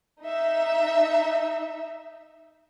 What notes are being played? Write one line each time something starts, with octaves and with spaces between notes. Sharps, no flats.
D#4 E5